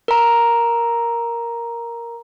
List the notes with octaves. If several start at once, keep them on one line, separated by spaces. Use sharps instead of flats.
A#4 A#5